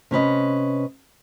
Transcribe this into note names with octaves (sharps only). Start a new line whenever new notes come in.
C3 C#4 B4 D#5